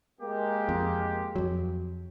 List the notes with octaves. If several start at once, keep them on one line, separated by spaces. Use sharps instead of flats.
G#3 A#3 G4
F2
F2 F#3